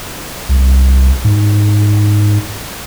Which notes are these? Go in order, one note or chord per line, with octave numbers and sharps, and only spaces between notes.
C2
G#2